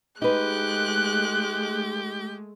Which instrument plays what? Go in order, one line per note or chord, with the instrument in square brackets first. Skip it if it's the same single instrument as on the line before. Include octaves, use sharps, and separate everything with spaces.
[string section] G#3 A3 [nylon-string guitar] D#4 B4 [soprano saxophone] G4 [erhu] F#6